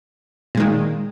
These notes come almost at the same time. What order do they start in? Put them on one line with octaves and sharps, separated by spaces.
A#2 G#3 D#3